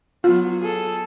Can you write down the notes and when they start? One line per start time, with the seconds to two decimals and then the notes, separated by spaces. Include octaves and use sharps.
0.24 F#3 B3 F4
0.60 G#4 A4